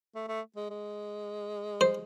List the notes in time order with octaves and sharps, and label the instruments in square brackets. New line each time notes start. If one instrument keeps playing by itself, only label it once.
[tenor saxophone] A3
A3
G#3
G#3
[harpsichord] C5